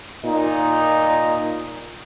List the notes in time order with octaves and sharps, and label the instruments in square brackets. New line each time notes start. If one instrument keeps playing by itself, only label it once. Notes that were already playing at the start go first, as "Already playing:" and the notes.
[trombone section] A#2 D#4